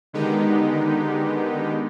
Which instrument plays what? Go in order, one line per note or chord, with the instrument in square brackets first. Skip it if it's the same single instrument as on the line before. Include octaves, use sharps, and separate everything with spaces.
[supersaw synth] D3 D#3 G#3 B3 D#4 G4